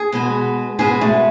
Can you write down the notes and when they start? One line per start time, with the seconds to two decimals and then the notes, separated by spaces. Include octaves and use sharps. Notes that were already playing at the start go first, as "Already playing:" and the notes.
Already playing: G#4
0.12 B2 G#3 B3 F#4 B4
0.79 B2 G#3 B3 F#4 G#4 B4
1.01 A3